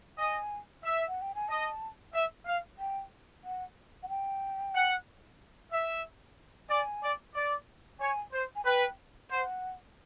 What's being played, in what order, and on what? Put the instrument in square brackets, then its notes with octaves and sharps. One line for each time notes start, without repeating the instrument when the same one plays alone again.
[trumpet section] D#5 [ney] G#5
[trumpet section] E5
[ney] F#5
G5
G#5
[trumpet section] D#5 [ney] A5
[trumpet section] E5
F5
[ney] G5
F#5
F#5
G5
[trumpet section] F#5
E5
[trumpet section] D5 [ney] G#5
[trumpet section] D5
D5
[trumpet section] C#5 [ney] G#5
[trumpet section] C5
[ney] G#5
[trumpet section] B4 [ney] G5
[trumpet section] C5 [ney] F#5